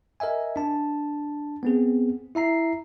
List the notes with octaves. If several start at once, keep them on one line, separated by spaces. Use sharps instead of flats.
A#4 D#5 E5 G#5
D4 A5
B3 C4 G#4
E4 E5 A#5 C7